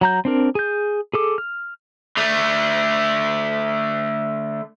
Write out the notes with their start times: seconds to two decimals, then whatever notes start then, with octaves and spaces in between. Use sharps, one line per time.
0.01 F#3 A#5 G6
0.25 C4 D4 A#4
0.55 G#4 G6
1.14 G#4 A4 D6
1.38 F6
2.17 D3 A3